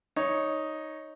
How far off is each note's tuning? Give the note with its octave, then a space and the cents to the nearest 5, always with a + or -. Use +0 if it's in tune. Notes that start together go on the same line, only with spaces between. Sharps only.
D#4 +5 C#5 +0